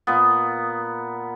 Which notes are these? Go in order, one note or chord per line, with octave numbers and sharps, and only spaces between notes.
A#2 B3